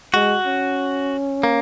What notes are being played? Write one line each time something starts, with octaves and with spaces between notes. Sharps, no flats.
G#3 F#4
C#4
A#3